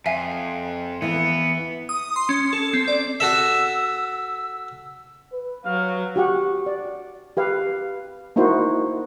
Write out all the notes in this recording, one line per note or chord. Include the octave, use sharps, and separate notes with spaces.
F2 E5 F5 G#5
E2 E3 B3
D#6
C6
C#4
A4
C4
D5
F#4 A4 E5 E6
B4
F#3 F5
F#4 G4 F#5
D5
G4 B4 F5
A#3 D#4 E4 F#4 C5